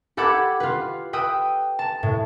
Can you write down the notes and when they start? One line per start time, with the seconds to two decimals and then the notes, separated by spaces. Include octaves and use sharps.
0.17 G4 A4 F#5 B5 D6 G#6
0.60 F4 B4
1.13 B4 G5 D#6 E6
1.79 A5
2.03 A2